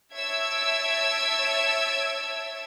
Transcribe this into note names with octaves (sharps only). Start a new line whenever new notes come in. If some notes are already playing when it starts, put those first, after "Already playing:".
C#5 E5 A5 E6 G#6 D7